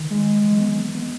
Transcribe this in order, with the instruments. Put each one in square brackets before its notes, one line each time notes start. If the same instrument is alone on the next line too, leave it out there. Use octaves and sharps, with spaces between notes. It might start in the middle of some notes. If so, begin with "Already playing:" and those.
Already playing: [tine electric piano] D#3
[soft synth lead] G#3
[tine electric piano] E3
F#3
B3
G#3
B3
B3